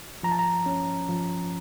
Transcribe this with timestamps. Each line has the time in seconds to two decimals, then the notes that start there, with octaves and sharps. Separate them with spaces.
0.23 F3 A#5
0.32 A5
0.39 A#5
0.66 C#4
1.09 F3